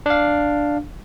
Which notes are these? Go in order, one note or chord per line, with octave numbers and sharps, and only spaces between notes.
D4 F5